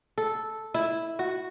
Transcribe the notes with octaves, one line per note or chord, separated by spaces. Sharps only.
A4
E4
F#4